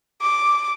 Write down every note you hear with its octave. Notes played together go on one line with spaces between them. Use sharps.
D6